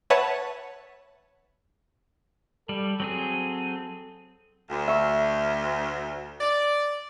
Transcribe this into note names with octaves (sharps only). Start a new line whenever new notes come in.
B4 C#5 E5 F#5 A5 F#6
G3 A4
F#3 C4 G#4
D2
E5 C#6
D5